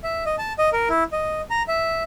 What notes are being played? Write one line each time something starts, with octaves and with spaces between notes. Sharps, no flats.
E5
D#5
A5
D#5
A#4
E4
D#5
A#5
E5